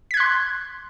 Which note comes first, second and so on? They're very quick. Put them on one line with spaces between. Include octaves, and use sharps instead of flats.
B6 G#6 F#6 C6